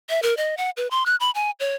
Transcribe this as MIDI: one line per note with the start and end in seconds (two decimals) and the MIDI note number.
0.10 0.22 76
0.23 0.36 70
0.37 0.57 75
0.57 0.70 78
0.77 0.88 71
0.91 1.06 84
1.06 1.16 90
1.20 1.31 83
1.35 1.51 80
1.60 1.75 73